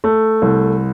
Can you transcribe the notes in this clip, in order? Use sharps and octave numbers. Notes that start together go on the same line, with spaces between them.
A3
C2